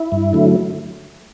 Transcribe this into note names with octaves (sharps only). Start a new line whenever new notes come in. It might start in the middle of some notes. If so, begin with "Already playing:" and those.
Already playing: E4
G2
D3 F#3 A3